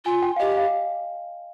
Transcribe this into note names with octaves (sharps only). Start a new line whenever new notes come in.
F4 G#5
G5
F5
G4 D#5
F5